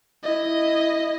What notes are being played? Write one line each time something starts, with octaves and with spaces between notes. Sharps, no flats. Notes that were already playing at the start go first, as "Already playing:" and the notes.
E4 D#5